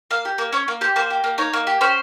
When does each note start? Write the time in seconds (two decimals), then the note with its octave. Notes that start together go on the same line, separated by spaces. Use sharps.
0.11 A#3 F5
0.25 G4
0.38 A#3
0.52 C#4 C#5
0.68 A#3
0.81 G4 C5
0.96 A#3 C5
1.10 G4
1.24 A#3
1.38 D#4 C#5
1.53 A#3
1.67 G4
1.81 C#4 C5